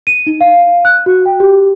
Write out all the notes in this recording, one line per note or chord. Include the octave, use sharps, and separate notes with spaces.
D#7
D#4
F5
F#6
F#4
G5
G4